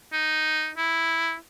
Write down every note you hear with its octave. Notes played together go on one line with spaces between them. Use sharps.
D#4
E4